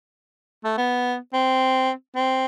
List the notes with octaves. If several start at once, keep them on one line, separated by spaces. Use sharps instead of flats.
A3
B3
C4
C4